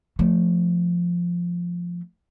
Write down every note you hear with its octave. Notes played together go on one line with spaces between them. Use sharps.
F3 A3